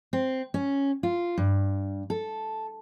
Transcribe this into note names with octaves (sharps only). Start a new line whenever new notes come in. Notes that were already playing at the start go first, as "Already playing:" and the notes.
C4
C#4
F4
G2
A4